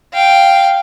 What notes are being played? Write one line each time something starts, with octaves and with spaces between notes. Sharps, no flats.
F5 G5